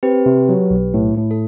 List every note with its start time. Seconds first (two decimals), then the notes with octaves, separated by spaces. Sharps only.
0.03 C4 G4 B4
0.26 C3
0.49 F#3
0.71 B1
0.94 A2
1.17 A2
1.31 A4